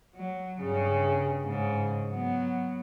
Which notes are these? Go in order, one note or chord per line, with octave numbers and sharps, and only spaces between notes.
F#3
G2 C#3
G#2 C#3
F#3 B3